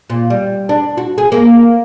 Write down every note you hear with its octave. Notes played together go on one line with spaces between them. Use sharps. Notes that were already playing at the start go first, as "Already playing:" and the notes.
A#2
G3
D4
F#4
G#4
A#3